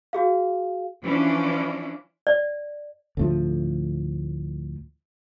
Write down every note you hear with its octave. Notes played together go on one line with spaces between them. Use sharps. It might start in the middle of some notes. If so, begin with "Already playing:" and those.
F#4 G#4 F5
E3 F3 C#4 D4
D5
D2 A2 F3